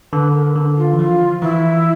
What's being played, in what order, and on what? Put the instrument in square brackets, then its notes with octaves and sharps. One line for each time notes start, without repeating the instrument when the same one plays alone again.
[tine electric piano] D3 [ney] B4
[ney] A#4
[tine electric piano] D3
[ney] F4
[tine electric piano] E3
[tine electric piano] F3 [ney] F4
[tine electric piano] E3 [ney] E4